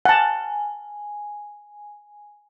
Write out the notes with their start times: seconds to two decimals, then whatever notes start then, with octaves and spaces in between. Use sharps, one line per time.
0.05 F#5 G#5 A5